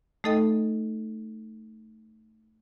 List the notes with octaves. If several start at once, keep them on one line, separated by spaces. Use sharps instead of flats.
A3 D#4 A4 D#5 G5